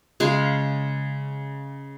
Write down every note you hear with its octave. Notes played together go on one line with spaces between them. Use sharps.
C#3 G#3 F5